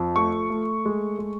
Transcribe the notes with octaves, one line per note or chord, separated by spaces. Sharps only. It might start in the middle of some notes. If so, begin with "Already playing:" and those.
Already playing: F2 F3
A3 C#6
A3
G#3
G#3